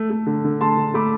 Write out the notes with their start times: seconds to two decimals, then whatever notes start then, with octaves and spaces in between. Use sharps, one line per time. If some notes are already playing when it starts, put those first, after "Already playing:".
Already playing: A3
0.10 A3
0.26 D3
0.44 D3
0.61 A3 A5 C6
0.77 D3
0.94 A3 B5 D6